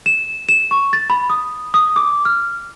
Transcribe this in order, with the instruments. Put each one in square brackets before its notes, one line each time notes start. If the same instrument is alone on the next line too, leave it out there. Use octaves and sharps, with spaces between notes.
[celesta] E7
E7
C#6
A6
B5
D#6
D#6
D6
F6